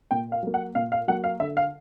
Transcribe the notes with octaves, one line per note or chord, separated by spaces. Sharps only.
A#2 G5
F5
F#3 A#3
F#5
A#2 F5
F5
F#3 A#3 F#5
F5
D3 E5
F5